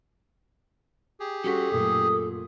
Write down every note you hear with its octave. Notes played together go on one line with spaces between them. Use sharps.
G4 G#4
G3 C#4 F#4 A4 B6
F#2 A#2 A3 D#6